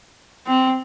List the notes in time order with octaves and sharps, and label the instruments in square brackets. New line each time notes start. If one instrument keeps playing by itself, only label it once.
[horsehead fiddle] C4